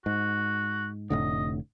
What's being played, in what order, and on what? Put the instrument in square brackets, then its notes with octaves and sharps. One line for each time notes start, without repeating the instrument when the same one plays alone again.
[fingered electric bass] G#2 [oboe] F#4
[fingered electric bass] F1 A2 D3 [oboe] D#5